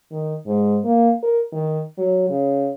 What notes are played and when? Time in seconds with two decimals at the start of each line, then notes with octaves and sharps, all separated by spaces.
0.12 D#3
0.46 G#2
0.85 A#3
1.23 A#4
1.52 D#3
1.98 F#3
2.29 C#3